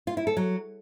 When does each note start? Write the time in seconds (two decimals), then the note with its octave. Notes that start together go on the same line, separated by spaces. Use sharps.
0.07 F4
0.17 E4
0.27 A4
0.37 F#3